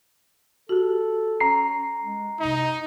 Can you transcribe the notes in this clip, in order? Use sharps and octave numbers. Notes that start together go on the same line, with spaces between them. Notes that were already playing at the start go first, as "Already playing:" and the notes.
F#4 G4 A4
C#4 A#5 C7
G#3
C3 D#4